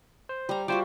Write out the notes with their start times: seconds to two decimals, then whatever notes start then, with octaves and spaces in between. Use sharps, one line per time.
0.29 C5
0.49 G3 A#5
0.68 G3 F4 F#4 C5 G5 D6